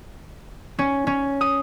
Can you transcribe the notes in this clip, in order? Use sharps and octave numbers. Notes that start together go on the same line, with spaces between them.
C#4
C#4
D#6